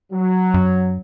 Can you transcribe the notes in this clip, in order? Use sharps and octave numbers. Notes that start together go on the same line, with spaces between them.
F#3
F#2